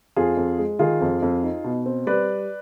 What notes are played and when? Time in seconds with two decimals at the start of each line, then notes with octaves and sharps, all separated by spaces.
0.16 F2 F4 G#4
0.37 F2
0.59 G#3
0.79 D#3 F4 G#4
1.01 F2
1.22 F2
1.43 D#4
1.64 B2
1.86 C4
2.06 G3 B4 D5